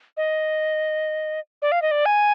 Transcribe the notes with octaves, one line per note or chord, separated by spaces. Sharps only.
D#5
D5
F5
D#5
D5
G#5